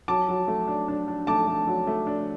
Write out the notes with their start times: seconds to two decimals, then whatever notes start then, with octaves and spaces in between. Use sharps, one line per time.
0.08 F#3 A5 D6
0.29 F#3
0.48 A3
0.68 D4
0.88 D4
1.08 D4
1.27 A3 A5 D6
1.47 A3
1.67 F#3
1.87 A3
2.07 D4